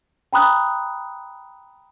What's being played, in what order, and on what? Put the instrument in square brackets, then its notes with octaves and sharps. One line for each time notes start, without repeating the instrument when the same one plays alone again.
[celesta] G5 A#5 B5 D#6 F#6